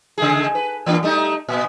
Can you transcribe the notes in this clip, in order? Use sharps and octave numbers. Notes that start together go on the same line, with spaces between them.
C#3 A3 G#4
B4
E3 A#3 D4
G3 A3 D#4
A#2 B3